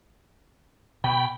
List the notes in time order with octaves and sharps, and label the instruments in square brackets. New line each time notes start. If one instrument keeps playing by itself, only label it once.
[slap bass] B2 [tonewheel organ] G5 B5